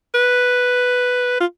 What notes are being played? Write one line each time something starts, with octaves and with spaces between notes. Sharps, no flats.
B4
F4